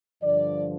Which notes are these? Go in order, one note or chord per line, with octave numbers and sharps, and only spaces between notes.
G2 D3 F3 D5